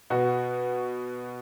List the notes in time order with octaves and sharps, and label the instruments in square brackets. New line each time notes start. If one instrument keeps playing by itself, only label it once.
[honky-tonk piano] B2 F#4